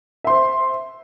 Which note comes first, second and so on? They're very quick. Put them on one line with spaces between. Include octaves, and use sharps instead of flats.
E5 C6 C5